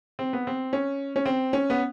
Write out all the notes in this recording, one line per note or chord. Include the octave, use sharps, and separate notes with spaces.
C4
B3
C4
C#4
C#4
C4
C#4
B3